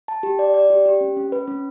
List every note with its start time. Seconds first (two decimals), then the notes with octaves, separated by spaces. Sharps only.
0.08 A5
0.23 G4
0.39 D5
0.54 D5
0.70 G4
0.86 G4
1.01 C#4
1.17 C#4
1.32 B4
1.48 C#4